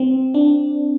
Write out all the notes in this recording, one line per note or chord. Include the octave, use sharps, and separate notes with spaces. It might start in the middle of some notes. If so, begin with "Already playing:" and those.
Already playing: C4
D4